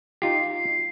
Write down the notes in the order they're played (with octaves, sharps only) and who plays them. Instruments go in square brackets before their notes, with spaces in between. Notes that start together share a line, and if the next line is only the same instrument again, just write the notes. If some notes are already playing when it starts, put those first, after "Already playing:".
[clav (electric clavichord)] D#4 F4 G4 [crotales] C7